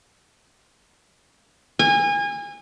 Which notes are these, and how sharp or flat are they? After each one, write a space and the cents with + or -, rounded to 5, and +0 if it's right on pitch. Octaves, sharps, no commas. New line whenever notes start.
G#5 -30